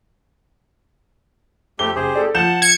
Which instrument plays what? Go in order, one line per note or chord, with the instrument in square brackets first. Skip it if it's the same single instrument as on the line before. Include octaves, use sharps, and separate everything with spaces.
[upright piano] F2 C4 G7 [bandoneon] A3 G4
[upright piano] F#1 [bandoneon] G4 G#4 C5
[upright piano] A4 D5
[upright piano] F3 G6 E7 [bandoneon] F#5 A5
[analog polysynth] G#6 C#7